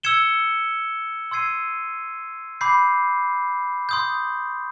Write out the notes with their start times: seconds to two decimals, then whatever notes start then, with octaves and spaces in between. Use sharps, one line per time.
0.03 E6 G#6 C#7 E7 G7
1.31 C6 E6 G#6 C7 D#7
2.61 B5 D6 G6 C7
3.89 C6 D#6 G6